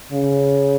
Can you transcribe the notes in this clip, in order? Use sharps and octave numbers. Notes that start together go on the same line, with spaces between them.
C#3